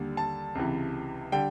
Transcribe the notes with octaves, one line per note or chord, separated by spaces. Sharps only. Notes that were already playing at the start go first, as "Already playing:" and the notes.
Already playing: D#2 D3 G3
A5
C#2 C3 E3
D3 G3 G5